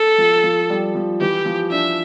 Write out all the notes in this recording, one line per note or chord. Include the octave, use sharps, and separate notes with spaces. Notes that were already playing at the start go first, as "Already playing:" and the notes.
Already playing: A4
F3
F3
G3
F3
E3 G4
F3
D4 E5